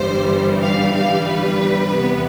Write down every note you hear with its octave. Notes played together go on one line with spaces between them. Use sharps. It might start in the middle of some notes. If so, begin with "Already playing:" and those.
Already playing: G1 G2 E3 G3 C5
F5
F5
B4
E2 C3 E3 B3